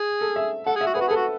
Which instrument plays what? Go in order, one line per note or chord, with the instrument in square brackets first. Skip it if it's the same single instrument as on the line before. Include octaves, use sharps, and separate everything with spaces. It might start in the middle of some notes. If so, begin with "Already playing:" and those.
Already playing: [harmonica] G#4
[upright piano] A4
E5
[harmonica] A4 [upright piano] F#5
[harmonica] G#4
[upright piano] E5
[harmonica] F#4
[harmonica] G#4 [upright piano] B4
[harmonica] F#4
G#4
[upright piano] A4
[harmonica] F#4